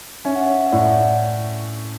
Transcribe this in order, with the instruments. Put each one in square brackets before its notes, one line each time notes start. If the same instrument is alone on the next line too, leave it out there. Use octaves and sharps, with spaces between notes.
[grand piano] C#4 [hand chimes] E5
[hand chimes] F#5
C#5 E5
E5
[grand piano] A2 [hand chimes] D5 F#5